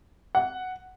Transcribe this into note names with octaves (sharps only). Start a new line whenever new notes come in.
F#5